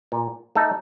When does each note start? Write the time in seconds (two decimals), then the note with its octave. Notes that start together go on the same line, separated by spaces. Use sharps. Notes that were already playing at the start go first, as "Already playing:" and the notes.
0.12 A#2
0.55 A3 D#4 A4